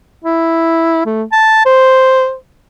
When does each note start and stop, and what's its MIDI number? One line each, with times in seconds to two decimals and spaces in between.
0.25 1.04 64
1.06 1.23 57
1.32 1.62 81
1.66 2.35 72